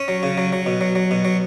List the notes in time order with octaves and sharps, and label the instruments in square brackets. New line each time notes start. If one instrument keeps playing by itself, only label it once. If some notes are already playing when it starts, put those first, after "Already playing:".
Already playing: [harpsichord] C#4
F#3
C#3
F#3
F#3
B2
F#3
F#3
B2
F#3